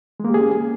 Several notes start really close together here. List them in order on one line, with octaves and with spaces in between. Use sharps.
G#3 A#3 G4 G#4 C#4